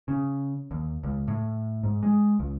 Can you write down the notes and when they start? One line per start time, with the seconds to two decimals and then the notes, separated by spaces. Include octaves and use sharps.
0.08 C#3
0.71 D#2
1.03 C#2
1.28 A2
1.83 G#2
2.03 G#3
2.39 C#2